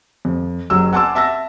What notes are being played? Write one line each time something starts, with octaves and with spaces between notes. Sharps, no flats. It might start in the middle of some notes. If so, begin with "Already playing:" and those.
F2
F#1 F#3 E6
F#5 G#5 A5 C6 D6 E6
E5 A5 E6 A#6